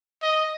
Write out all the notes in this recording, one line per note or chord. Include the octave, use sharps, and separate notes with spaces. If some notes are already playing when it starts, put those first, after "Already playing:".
D#5